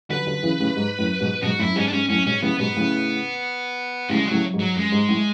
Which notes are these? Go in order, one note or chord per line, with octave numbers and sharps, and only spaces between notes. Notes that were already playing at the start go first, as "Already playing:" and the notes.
D3 F#3 B4
D3 F#3
C#3 E3
A2 C#3
G#2
F#2 A2
G#2 B2
G#2 B2 F#4
F#2 A2 E4
G#2 C#4
D4
G#2 C#4
F#2 A2 C#4
G#2 B2 C#4
A2 C#3 B3
G#2 B2 B3
A2 C#3
A2 C#3 G#3
F#3
A2 C#3
G#2
F#3
F#2 G#3
G#2
A2